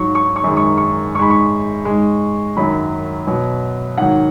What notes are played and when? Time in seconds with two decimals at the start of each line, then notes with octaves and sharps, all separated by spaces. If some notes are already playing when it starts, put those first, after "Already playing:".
Already playing: G#2 F#3 C#6
0.15 C#6
0.36 C#6
0.44 F#2 D#3 G#3
0.57 C#6
0.77 C#6
1.15 G#2 C#6
1.19 G#3 B5
1.30 C#6
1.85 G#2 G#3
2.57 F#2 D#3 F#3 B5
3.27 B2 F#3
3.97 G#2 D#3 F#3 F#5